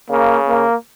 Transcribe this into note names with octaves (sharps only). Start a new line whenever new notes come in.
C#3 A#3
A#3